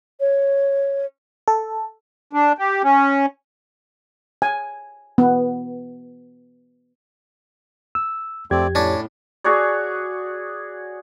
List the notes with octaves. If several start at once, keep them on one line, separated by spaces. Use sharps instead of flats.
C#5
A4
D4
G4
C#4
G#5
B3
E6
F2 A3 C4 G4 D5 G#6
A2 C#4 D4
F#4 G#4 C#5 D5